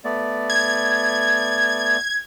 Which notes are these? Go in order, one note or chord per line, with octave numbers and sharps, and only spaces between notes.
A3 B3 D5
G#6